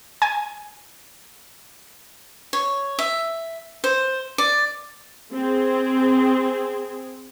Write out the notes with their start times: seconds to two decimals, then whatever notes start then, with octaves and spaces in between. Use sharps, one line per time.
0.22 G#5
2.53 C#5
2.99 E5
3.84 C5
4.38 D5
5.33 C4 G#4